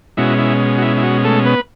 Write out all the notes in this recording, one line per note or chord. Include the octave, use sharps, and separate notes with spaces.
B2 G#3 C#4 E4 F#4
E4
F#4
E4
E4
F#4
A3 A4
B3 B4